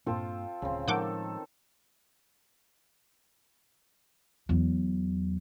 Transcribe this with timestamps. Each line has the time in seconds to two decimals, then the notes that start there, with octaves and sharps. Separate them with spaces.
0.06 G2 A#2 A#3 C4 D4 F4 A4
0.62 D1 G1 C#3 C4
0.88 A2 D#3 F3 G#3 A4 F#5 D6 G6
4.49 E2 F#3